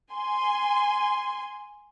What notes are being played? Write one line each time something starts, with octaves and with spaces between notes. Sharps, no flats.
G#5 C6